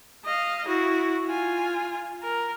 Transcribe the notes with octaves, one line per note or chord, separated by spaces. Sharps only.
D#5 F5
E4 F#4
F4 G#5
A#4